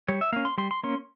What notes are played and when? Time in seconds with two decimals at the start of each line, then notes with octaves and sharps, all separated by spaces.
0.08 G3 C#5
0.21 E5
0.32 A#3 C#4 F5
0.45 C6
0.58 G3 C6
0.71 C6
0.83 A#3 C#4 C6